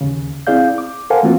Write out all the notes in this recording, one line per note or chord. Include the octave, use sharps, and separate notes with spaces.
D#2 C#3
C4 E4 G#4 D5 F5 G6
D6
A4 A#4 C5 F5 F#5 G#5
E3 A3 A#3 C4 F4 F#4